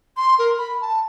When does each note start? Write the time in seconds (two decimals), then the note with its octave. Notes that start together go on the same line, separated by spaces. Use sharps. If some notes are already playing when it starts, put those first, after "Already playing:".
0.17 C6
0.39 A#4
0.58 B5
0.81 A5